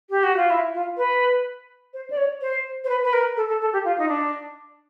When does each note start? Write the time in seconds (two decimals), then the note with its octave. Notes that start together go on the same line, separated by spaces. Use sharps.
0.10 G4
0.23 F#4
0.37 F4
0.50 E4
0.74 F4
0.97 B4
1.93 C5
2.10 D5
2.17 C#5
2.41 C5
2.84 C5
2.89 B4
3.03 B4
3.13 A#4
3.36 A4
3.48 A4
3.61 A4
3.73 G4
3.85 F4
3.98 D#4
4.08 D4